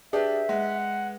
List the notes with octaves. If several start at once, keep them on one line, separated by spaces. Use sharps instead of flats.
D4 G4 G#4 B4 E5
G#3 F#5